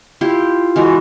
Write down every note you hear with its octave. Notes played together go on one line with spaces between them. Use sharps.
E4 F4 G4
E3 G#3 F#4 A#4